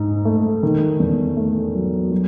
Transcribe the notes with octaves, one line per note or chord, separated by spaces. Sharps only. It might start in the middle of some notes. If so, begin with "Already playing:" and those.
Already playing: G#2 D#4
A3
D#3
E2
A3
F#3
F#3